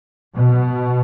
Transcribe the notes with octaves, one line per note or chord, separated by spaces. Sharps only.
B2